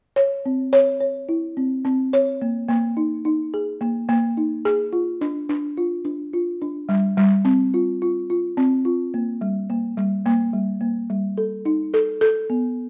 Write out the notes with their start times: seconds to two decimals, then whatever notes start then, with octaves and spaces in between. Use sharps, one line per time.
0.16 C#5
0.46 C4
0.73 C#5
1.00 C#5
1.29 E4
1.57 C4
1.85 C4
2.13 C#5
2.42 A#3
2.68 A#3
2.97 D#4
3.25 D#4
3.54 G#4
3.81 A#3
4.09 A#3
4.37 D#4
4.65 G#4
4.93 F4
5.21 D4
5.49 D4
5.77 F4
6.05 D4
6.33 F4
6.62 D4
6.89 G3
7.17 G3
7.45 C4
7.74 F4
8.02 F4
8.30 F4
8.57 C4
8.85 F4
9.14 A#3
9.41 G3
9.70 A#3
9.97 G3
10.26 A#3
10.53 G3
10.81 A#3
11.10 G3
11.38 A4
11.65 D#4
11.94 A4
12.21 A4
12.50 B3